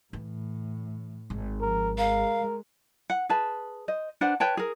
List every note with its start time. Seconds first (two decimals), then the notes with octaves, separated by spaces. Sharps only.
0.13 A2 E3
1.30 G#1
1.61 F3 A#4
1.98 G#3 A#4 F5
3.10 F#5
3.29 G#4 B4 A5
3.88 C5 D#5
4.21 D4 B4 C5 F#5
4.40 B4 C#5 G5 A5
4.57 G#4 A#4